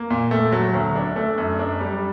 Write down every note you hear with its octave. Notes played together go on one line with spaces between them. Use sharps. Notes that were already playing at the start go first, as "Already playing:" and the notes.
Already playing: A#3
A#2
A3
F#3
D2
D4
A3
F#2
D4
G3